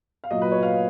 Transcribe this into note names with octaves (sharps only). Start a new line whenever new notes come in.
F5
A#2 F#3 D#5
B4
C#5
F5